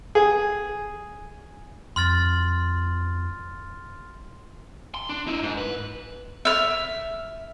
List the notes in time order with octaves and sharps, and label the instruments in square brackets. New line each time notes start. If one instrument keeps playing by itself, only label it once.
[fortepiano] G#4
[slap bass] F2 [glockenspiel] C6 F6 A6
[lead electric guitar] C6
D4
D#4 E4
G#2
B4
[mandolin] E5 F6